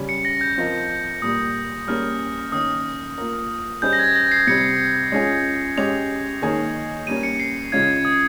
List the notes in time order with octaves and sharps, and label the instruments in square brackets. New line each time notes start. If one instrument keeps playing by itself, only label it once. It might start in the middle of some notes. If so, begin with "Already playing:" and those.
Already playing: [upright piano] C#3 G3 C#4
[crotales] C#7
A#6
G6
[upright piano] F3 C4 F4 A#4 D#5
[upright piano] A#2 G3 A#3 [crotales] D#6
[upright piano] G3 A#3 C#4 G#4 [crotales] F6
[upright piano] D#3 A#3 C#4 [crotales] D#6
[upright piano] A#3 F4 A#4
[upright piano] G3 C#4 G#4 C5 D#5 [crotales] G6
[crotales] A#6
G#6
A#6
C7
[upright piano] C3 G3 C4 [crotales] C#7
[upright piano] G#3 C#4 F4 G#4
[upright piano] G#3 C#4 G4 [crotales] F7
[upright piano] D#3 A#3 D#4 G#4 C#5
[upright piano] G3 A#3 C#4 [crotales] D#7
[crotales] C#7
C7
[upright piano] C#3 G#3 C#4 F4 [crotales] G#6
[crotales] D#6